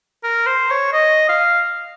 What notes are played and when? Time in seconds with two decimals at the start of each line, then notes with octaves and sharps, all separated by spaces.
0.23 A#4
0.46 C5
0.71 C#5
0.93 D#5
1.29 F5